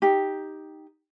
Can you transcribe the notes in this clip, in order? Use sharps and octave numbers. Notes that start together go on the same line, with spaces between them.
D#4 G4